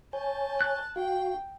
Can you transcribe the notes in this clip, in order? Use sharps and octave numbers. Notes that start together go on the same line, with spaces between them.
C#5 G#5 A5 G6
F#6
F#4 F5 G5